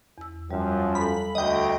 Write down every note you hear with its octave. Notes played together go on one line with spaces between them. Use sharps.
E2 E6
F#2 F3 G3
A4 F5 G#5 B5
D2 D#5 G5